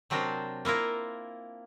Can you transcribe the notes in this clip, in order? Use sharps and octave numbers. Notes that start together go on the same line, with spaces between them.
C3 F#3 C4 D4 A#4 C5
A#3 E4 F4 A#4